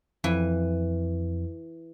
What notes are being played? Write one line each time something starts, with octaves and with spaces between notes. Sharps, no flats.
F2 E3